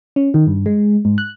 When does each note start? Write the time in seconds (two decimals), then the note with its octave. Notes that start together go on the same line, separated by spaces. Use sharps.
0.16 C#4
0.34 D#3
0.47 G2
0.66 G#3
1.05 G#2
1.18 F#6